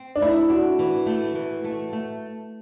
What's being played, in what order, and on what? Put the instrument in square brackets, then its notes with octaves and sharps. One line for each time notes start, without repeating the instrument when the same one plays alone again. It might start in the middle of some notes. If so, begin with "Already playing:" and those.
Already playing: [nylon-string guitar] C4
[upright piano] D4
[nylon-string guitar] A3 [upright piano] E4
[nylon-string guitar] D4 [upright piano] F#4
[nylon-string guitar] E3
A3
E3
A3
A3